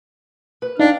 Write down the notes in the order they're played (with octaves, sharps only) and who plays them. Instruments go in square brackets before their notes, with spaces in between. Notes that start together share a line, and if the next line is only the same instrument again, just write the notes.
[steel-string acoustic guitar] B4
[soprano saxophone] D4 [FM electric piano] D#4 [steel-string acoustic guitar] F5 G5